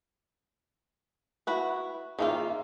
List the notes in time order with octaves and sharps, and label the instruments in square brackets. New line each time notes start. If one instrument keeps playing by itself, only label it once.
[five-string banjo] E4 F#4 B4
[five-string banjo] D#3 A#3 F4 [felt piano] G#4 E5